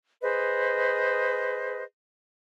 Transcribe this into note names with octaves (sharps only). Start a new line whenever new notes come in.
G#4 B4 C5 D#5